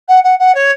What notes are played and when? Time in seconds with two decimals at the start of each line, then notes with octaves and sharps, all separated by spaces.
0.08 F#5
0.24 F#5
0.39 F#5
0.55 C#5